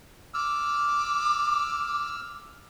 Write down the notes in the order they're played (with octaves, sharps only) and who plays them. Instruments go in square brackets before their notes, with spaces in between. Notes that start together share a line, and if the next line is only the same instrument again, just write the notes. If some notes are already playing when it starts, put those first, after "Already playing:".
[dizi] D6 [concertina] E6 F6